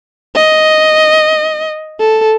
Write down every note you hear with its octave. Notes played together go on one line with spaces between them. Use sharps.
D#5
A4